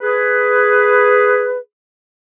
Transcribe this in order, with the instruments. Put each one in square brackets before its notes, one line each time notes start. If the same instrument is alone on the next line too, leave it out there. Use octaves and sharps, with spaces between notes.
[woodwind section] G#4 B4